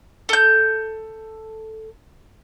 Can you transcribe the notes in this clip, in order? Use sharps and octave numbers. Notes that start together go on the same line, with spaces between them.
A4 G6